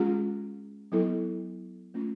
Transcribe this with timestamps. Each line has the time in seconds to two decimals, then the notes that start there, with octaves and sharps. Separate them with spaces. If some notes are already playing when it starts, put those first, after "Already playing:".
Already playing: G#3 C#4 F4 G#4
0.92 F#3 B3 E4 A4
1.94 A3 C#4 F4